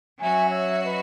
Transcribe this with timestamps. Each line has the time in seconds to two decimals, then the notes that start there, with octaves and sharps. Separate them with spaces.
0.18 F#3 C#4 F#4 E5 G#5
0.50 C#5 E5
0.82 B4 D#5